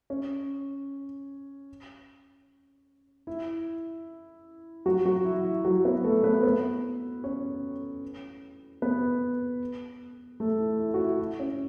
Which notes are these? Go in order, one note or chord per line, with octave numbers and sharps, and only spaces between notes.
C#4
E4
F#3 F#4
F#3 F#4
E4
E4
F#3 F#4
B3 B4
A3 A4
B3 B4
B3 B4
C#4 C#5
B3 B4
A3 A4
E4
E4
F#4
E4
E4
C#4